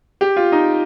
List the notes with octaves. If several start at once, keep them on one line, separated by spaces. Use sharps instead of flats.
G4
F4
D#4